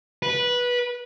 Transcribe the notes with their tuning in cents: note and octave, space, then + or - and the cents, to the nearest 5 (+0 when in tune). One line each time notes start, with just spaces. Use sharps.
B4 -15